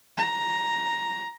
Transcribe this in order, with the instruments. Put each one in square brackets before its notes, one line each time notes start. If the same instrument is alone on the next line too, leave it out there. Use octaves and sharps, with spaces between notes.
[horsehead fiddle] A#5